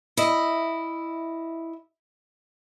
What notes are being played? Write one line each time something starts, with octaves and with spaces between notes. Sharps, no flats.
E4 D#5